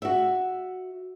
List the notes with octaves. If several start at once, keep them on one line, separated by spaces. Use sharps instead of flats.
F#4 E5